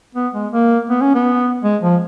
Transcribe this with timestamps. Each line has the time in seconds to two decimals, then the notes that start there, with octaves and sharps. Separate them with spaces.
0.15 B3
0.34 G#3
0.53 A#3
0.90 B3
1.02 C#4
1.15 B3
1.64 G#3
1.83 F3